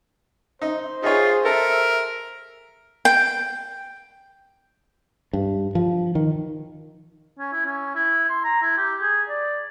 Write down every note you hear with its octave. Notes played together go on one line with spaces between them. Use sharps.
D#4 C5
D#4 F4 G#4 C#5
A4 A#4 E5
G5
G2
F3
D#3
C#4
E4
C#4
E4
C6
A#5
E4
G4
G#4
D5